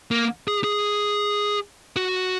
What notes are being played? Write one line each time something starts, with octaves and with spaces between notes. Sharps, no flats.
A#3
G#4
G#4
F#4